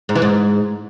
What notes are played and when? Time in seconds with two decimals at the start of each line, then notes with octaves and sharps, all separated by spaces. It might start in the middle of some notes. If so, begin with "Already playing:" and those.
0.09 G#2
0.15 E3
0.22 G#2